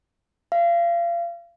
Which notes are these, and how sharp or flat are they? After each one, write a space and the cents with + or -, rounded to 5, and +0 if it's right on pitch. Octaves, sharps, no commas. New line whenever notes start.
F5 -30